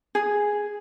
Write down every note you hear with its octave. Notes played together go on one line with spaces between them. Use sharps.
G#4